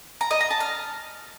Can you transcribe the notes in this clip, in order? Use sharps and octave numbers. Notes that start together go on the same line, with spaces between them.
A#5
D#5
A#5
A5
F6